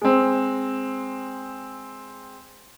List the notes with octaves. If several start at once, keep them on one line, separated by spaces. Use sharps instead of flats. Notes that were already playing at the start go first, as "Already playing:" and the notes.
G#3 C4